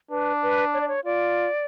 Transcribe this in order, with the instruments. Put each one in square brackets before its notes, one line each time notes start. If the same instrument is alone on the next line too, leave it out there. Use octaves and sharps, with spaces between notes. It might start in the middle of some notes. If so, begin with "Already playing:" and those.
[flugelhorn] D4 [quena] B4
[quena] B4
C#5
D5
C#5
[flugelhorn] F4 [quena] D5